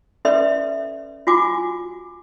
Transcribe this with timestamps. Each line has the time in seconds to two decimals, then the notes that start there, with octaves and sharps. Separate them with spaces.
0.25 C#4 A4 B4 D5 E5 C6
1.27 F4 F#4 G#5 D6